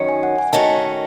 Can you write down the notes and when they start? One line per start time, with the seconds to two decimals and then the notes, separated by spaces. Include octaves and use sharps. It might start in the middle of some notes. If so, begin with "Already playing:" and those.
Already playing: F#2 D#3 F#3 C#4
0.09 G#5
0.23 F#5
0.38 G#5
0.52 D#3 A3 C#4 F#4 A5